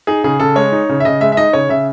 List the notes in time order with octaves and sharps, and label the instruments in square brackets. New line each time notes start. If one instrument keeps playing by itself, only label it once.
[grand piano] D#4 G#4
C#3 G#4
C#3 A4
G#3 C#5
D#4
C#3
E5
C#3 D#5
G#3 E5
E5
D#4 D#5
C#3 C#5
C#3 E5